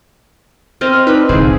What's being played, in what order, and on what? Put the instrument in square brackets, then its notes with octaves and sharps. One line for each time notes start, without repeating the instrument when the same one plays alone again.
[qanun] C4 D#5 E5 [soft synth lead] F6
[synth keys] D4 B4 [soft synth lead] D#4
[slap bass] D1 C2 [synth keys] E3 C5 [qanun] G#4